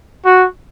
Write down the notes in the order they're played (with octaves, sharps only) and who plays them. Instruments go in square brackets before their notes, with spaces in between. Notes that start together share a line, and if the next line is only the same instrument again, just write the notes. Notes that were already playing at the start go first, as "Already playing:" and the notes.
[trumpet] F#4